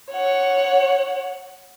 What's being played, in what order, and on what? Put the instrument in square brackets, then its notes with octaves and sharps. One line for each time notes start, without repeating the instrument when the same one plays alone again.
[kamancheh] C#5 F#5